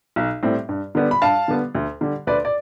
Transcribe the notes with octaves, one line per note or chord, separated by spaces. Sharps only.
B1
A2 G3 C4
G2
D3 G3 B3
B5
G2 F5 A5
D3 G3 B3
D2
D3 G3
D2 B4 D5
D5